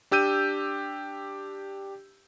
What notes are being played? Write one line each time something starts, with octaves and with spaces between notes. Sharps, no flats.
D4 G4 E6 G6 D#7